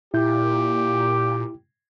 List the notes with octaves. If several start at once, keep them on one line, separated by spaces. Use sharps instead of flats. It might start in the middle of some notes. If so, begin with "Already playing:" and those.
A#2 E4 G4 G6